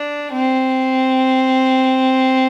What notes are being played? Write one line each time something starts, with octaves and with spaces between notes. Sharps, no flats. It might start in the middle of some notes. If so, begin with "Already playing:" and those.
Already playing: D4
C4